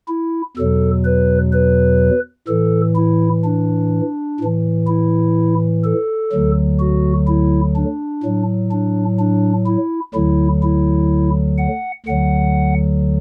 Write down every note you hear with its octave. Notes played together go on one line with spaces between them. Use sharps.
E4
E2 B2 F#3 A4
B4
B4
A2 E3 A4
E4
D4
A2 E3
E4
A4
D2 D3 F#3
F#4
E4
D4
A2 F#3
D4
D4
E4
D2 D3 F#3 E4
E4
F#5
D2 D3 F#3 F#5